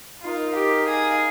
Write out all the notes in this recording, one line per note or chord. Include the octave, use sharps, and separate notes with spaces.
D#4 F4 A#4 F5
G4
G#4